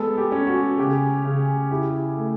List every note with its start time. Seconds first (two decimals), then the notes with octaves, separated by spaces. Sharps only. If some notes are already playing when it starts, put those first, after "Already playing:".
Already playing: G#3 B3 A4
0.17 G4
0.32 C#4
0.47 F#4
0.78 C#3 G4
1.24 C#3
1.70 E4 G4
2.16 A3